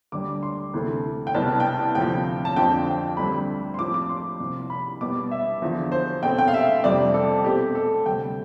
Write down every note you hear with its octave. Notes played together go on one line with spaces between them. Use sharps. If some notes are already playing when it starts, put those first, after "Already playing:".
D2 D3 G3 D6
C6
D2 C3 E3 A3
G5
C2 B2 B3 A5
G5
A5
D2 C3 F3 G5
A5
F2 D3 F3 C4 G5
G5
D2 D3 G3 C4 B5
C6
A2 F3 C4 D6
D6
C6
C2 C3 F3
B5
B2 G3 B3 D6
E5
E2 D3 F3
C5
B2 A3 C4 G5
G5
F5
E5
F2 C3 G3 D5
A4
B2 A3 C4 G4
A4
D2 C3 G3 G5